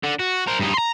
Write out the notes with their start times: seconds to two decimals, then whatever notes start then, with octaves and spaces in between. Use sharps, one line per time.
0.03 D3
0.19 F#4
0.47 A#4 C5
0.60 G2 D#4
0.74 A#5 C6